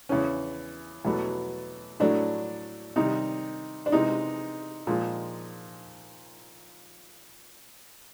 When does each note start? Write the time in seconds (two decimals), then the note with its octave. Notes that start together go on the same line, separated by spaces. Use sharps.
0.09 E2 C#3 E3 C#4
1.05 E2 B2 F#3 A3
2.00 A2 F#3 A3 D4
2.96 C3 D#3 G3 D#4
3.86 D4
3.92 C3 E3 G#3 D#4
4.87 A#2 F3 G#3